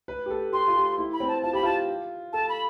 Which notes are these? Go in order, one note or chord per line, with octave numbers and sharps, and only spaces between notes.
B4
G4
A4
G4 C6
F4
G4
E4
B5
C4
A5
F4 A5
G4 B5
F4 A5
A4 A5
B5